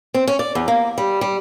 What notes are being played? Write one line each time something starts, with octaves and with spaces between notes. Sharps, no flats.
C4
C#4
D5
E2
A#3
G3
G3